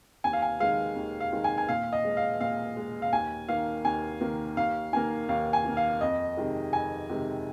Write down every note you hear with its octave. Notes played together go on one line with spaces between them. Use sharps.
D#2 G#5
F5
G#5
D#3 G#3 F5
D#2
F5
D#3 G#3
G#5
G#5
A#2 F5
D#5
G#3
F5
A#2 F5
G#3
F5
D#2 G#5
D#3 A#3 F5
D#2 G#5
D#3 A#3
D#2 F5
D#3 A#3 G#5
D#2 F5
G#5
D#3 A#3
F5
F2 D#5
C3 D#3 G#3
F2 G#5
C3 D#3 G#3